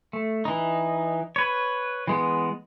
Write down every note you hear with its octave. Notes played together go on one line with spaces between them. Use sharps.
A3
E3 D#4
B4 C#5
E3 G#3 B3